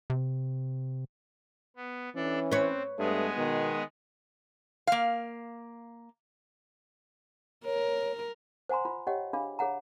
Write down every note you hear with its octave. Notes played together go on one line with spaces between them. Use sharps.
C3
B3
E3 C#4 D4 A4
C4 B4 C#5
G2 G#3 A3 B3 G#4
B2 D#3
A#3 F5
A#4 C#5
C5 F#5 G#5 A#5 C6
F4 B5
G4 C#5 D#5 F#5 G5
D4 G#4 F5 B5
G#4 C#5 F#5 A#5